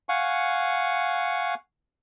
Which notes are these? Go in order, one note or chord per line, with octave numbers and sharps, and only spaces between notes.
F5 F#5 G#5 C#6